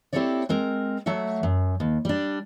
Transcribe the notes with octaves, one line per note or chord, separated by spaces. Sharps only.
C4 E4 G4 A4 C#5 D5
G#3 C4 A#4
F#3 A3 E5 F#5
F#2
D#2
G3 D4